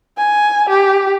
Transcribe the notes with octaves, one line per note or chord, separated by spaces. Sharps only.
G#5
G4